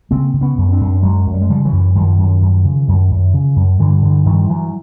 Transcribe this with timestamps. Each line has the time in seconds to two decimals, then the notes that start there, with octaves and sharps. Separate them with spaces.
0.11 C#3 A#3 C4
0.34 C#3
0.41 B3 C#4
0.58 F#2
0.72 C4 D4
0.81 F#2
1.03 F#2 F#3 G#3
1.26 F#2
1.34 G3
1.42 G#3
1.49 C#3 F3 G3
1.65 E3 F#3
1.72 F#2
1.95 F#2 D#3 F3
2.18 F#2
2.42 F#2
2.65 C#3
2.88 F#2
3.11 F#2
3.34 C#3
3.56 F#2
3.79 G2 D3 E3
4.02 G2 D3 E3
4.25 G2 D#3 F3
4.49 G2 E3 F#3